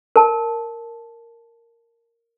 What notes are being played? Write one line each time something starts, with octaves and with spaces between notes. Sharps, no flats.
A#4 A5